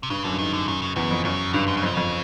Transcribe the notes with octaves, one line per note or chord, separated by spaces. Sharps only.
C3
G2 C#3
F#2 D3
G2
G#2 D#3
D3
F#2 D#3
C#3
E2 C#3
F2
F#2 C#3
G2 D3
D3
C#3
F2 C3
F2 C#3